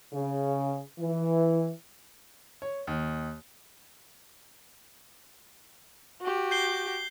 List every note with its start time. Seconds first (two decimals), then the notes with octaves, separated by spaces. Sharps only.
0.13 C#3
0.99 E3
2.62 C#5
2.87 D#2
6.21 F#4 G4
6.51 G6 C7 G7